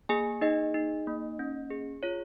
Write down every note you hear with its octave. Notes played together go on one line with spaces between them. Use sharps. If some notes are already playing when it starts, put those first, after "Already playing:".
A#3 G#4 G#5
D#4 G#4 D#5
D#4
A#3
C#4
G#4
F4 C#5